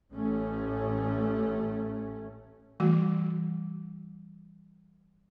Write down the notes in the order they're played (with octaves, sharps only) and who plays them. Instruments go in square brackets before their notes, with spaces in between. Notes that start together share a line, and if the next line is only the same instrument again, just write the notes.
[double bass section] A1 A3 C#4
[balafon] E3 G3 A3 F#4